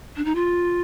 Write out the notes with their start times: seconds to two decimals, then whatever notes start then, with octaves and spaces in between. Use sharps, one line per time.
0.16 D4
0.25 D#4
0.35 F4